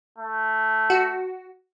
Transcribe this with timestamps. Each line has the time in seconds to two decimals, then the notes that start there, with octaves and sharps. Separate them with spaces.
0.18 A3
0.90 F#4